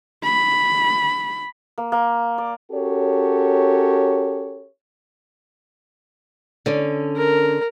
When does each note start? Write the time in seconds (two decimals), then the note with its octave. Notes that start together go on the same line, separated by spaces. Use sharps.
0.24 B5
1.78 A#3
1.92 A#3
2.38 D5
2.71 C#4 F#4 G4 A4 A#4 C#5
6.66 D3 C#4
7.17 A#4